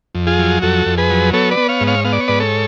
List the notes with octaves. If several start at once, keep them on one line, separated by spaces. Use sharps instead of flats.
F2
F4 G#4
F#3
F2 F#4 A4
F2
G#4 B4
F#3
B3 A4 C#5
B4 D5
B3
C#5 F5
G#2
C#5 F5
B3 F5
D5
C#5
G#2 B4 D5
A4 C#5